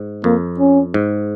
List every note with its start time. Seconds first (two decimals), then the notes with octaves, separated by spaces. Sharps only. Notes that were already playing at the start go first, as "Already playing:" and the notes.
Already playing: G#2
0.24 F2 A#3
0.59 C#4
0.94 G#2